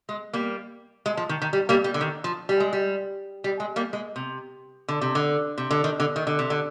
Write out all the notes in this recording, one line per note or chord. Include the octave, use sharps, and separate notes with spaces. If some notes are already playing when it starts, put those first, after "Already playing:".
G#3
G3 A#3
G#3
F3
D#3
D#3
G3
G3 A#3
G3
D3
D#3
F3
G3
G#3
G3
G3
G#3
G3 A#3
G#3
C3
D3
C3
D3
C3
D3
D#3
D3
D#3
D3
C3
D3